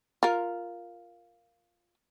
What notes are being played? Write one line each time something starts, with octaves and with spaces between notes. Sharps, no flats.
F4 A#4